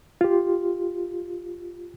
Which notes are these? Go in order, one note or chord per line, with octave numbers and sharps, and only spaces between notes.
F4 G4